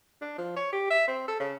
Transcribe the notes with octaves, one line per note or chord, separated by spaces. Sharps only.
D4
F3
C#5
G4
E5
C4
A4
C#3